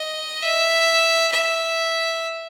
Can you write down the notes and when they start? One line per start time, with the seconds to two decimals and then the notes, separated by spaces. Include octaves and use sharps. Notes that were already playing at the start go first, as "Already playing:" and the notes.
Already playing: D#5
0.43 E5
1.32 E5